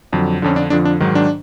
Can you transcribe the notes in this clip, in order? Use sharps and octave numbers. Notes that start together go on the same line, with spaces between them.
F2 D3 F#3
F2 D3 F3 C#4
D4
F2 D3 F3 D4
D4
G#2 D#3 F#3
D4